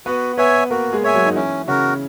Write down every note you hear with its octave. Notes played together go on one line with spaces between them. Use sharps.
B3 F#4 B4
B3 B4 C#5 E5 G#5
A#3 F#4 A#4
G#3 G#4
C#5 E5 G#5
F#3 F#4
D#4
E3 C#4 E4
C#3 C#4 F#4 A#4